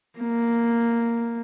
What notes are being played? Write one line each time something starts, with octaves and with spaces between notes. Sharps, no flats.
A#3